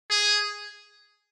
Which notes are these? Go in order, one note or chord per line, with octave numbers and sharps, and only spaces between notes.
G#4